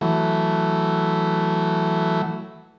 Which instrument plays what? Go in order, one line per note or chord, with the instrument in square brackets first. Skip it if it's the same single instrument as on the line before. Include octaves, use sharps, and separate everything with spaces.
[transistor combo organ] E3 F#3 A3